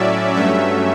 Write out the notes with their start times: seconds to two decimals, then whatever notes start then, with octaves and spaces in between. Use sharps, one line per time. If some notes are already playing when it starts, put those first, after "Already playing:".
Already playing: A2 F#3 C#4 D5 E5
0.35 G2 F#3 A3 C#4 E5